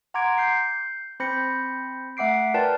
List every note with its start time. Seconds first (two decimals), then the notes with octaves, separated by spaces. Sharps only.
0.14 F#5 A#5 C6 D6 G#6 D7
0.38 G6 C7
1.20 C4 C5 B5 G6 A#6 C#7
2.17 A3 E5 F#5 D6 C7 D7
2.54 F4 A#4 B4 D5 G5 A5